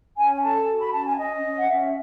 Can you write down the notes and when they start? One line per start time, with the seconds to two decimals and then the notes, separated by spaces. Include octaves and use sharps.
0.17 C#4 G#5
0.35 G#5
0.42 A4 A5
0.67 F#4
0.80 B5
0.92 C#4 A5
1.05 G#5
1.17 C#4 D#5
1.42 C#4
1.59 F#5
1.67 C#4 E5